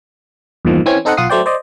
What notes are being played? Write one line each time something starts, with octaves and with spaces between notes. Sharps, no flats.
E2 G2 A#2 D#3 F3
E3 C4 C#4 G#6
C4 D#4 A4 C5 D#5 F#5
B1 F4 F#5 D#6 C7
F#3 A3 C5 D5 G5
C5 D5 D#5